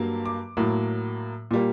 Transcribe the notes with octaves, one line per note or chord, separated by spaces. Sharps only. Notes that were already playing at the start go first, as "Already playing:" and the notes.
Already playing: G2 F#3 A#3
D6
A2 F#3 A#3
A#2 G3 A#3